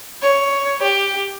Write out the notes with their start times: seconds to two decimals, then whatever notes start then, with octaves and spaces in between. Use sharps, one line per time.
0.22 C#5
0.82 G4